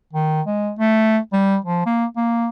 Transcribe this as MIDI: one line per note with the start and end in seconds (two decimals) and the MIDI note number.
0.13 0.41 51
0.47 0.71 56
0.79 1.18 57
1.33 1.58 55
1.65 1.85 53
1.86 2.05 58
2.16 2.48 58